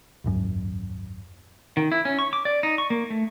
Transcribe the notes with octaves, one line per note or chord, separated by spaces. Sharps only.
D#1 G#1 F#2
D#3
E4
C#4
C#6
D6
D5
D#4
C#6
A#3
A3